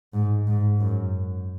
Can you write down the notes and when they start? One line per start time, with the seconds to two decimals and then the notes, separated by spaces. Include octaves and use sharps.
0.13 G#2
0.47 G#2
0.80 F#2